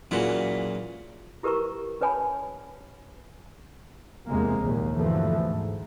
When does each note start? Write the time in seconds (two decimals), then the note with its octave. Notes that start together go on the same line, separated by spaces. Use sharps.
0.11 A#2 C#3 E3 F#3 F#5
1.43 E4 G4 A#4 B4 A#5 C#6
2.01 C#4 B4 C#5 G#5 A5 B5
4.28 E2 C3 G#3 A#3
4.61 A#1 D#2
4.94 G2 B2 D3 E3 F3 A3
5.45 G#2